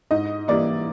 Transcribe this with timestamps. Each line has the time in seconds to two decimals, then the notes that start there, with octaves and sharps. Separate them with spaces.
0.11 G#2 D#5
0.48 E3 G3 A#3 D5